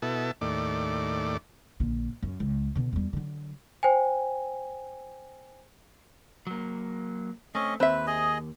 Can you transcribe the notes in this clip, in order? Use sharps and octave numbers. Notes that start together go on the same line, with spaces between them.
B2 E4 A4
D#2 A2 D5
A#1 D3
F#2
C#2
B2 D3
E2 G3
D3 F#3
C5 G5 G#5
F#3 A#3
A3 C4 C#4 D#5
D#2 C4 B4 E5
G#4 D#5